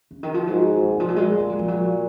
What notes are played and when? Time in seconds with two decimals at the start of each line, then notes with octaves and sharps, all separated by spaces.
0.11 C#3
0.23 D#3
0.34 F3
0.47 G#2 F#3
0.83 C#3
0.91 A#2 D#3
1.00 F3
1.08 F#3
1.16 G#3
1.40 G#3
1.50 F#3
1.59 F3
1.68 F#3